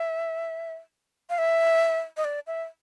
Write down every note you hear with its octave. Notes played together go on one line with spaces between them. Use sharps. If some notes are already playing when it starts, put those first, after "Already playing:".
Already playing: E5
F5
E5
D#5
D5
E5